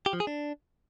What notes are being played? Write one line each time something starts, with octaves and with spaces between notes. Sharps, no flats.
G4
F3
G#4
D4